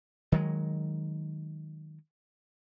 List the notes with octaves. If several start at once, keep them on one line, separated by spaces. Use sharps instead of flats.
D#3 F#3 G#3